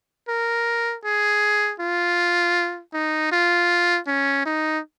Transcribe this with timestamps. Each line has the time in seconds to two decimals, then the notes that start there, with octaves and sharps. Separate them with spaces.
0.28 A#4
1.05 G#4
1.80 F4
2.93 D#4
3.32 F4
4.07 C#4
4.46 D#4